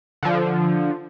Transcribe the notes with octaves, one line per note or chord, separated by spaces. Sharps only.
D3 F3